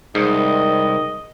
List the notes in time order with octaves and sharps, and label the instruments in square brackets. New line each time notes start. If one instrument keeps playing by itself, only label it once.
[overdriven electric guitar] C2 [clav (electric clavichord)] G#2 [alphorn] D#3 [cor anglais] D#5